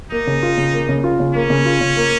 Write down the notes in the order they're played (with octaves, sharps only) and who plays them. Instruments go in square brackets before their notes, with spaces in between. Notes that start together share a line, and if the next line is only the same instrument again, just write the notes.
[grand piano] A#3 [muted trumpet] D#4
[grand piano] C#3
F4
C#3
A#3
C#3
F4
C#3
[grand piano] A#3 [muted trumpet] C#4
[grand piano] C#3
F4
C#3
A#3